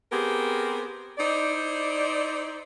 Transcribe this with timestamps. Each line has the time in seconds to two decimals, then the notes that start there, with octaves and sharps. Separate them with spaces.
0.11 B3 C4 G4 G#4 A#4
1.18 D#4 E4 C5 D5